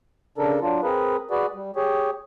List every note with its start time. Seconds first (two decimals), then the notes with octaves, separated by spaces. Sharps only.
0.38 C#3 D4 A4 A#4
0.61 F#3 D4 F4
0.83 C4 G#4 A#4 B4
1.30 F#4 G#4 B4 D5
1.55 G3
1.76 G4 G#4 C#5